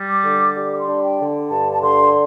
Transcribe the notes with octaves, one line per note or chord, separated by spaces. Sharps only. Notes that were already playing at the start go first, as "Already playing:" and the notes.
Already playing: G3
D6
D3
G3 D6
D6
C6
D4
G5
D3
G2 A5
A5
D3 C6